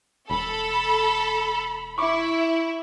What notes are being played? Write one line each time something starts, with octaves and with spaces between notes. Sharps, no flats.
E1 A4 B5
E4 C#6 D6